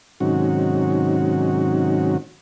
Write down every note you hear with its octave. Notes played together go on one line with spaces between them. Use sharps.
G#2 C3 D#3 F#3 C#4 F#4